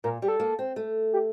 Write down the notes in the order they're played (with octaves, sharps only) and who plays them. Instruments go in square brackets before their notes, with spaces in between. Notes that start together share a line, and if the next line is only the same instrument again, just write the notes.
[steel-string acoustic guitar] A#2 [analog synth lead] A#4
[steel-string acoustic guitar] G3 [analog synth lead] G4
[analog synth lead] A4
[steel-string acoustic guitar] A#3
C4
A3
[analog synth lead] G4